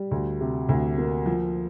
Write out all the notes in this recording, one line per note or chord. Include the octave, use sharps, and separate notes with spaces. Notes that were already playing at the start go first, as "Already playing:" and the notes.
Already playing: G3
D2
C3
D2
A#3
F3